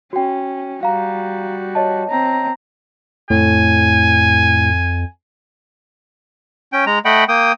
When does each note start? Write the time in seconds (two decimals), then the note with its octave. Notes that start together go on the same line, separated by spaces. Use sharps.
0.13 C#4 F#4 G5
0.83 G3 F#4 F5 A#5
1.75 C#5 D#5 A5
2.09 C4 A#5
3.30 F2 A2 G#5
6.73 C#4 G5
6.87 G#3 A#5
7.05 A3 D#5 F#5 G5 B5
7.29 A#3 G5 D#6